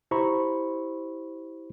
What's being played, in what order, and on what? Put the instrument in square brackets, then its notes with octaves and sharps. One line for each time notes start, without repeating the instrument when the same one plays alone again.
[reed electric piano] E4 G4 C5 A#5 B5 C#6